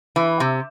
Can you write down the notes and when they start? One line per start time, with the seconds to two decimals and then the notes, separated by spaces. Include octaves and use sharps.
0.16 E3
0.40 C3